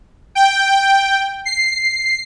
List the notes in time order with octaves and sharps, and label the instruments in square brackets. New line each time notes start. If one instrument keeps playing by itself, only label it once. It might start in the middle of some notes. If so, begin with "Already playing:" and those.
[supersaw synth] G5
C7